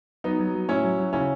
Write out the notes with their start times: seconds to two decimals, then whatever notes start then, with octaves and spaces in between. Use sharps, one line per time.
0.24 F#3 B3 D#4
0.39 F#3
0.55 F#3
0.69 A2 C#4 E4
0.84 F#3
0.99 F#3
1.13 C#3 C#4 E4